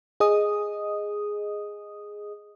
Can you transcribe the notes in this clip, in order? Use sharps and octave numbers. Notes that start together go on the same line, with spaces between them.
G#4 D#5 D#6